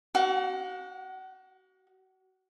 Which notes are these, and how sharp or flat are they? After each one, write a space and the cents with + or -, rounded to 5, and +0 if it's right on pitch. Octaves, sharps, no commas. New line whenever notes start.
F#4 +30 F#5 -30